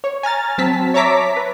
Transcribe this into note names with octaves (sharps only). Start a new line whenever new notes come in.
C#5
G#5 A#5 F6 A6
F#3 C4 A5 B6
C#5 E5 A5 A#5 D6 B6
B4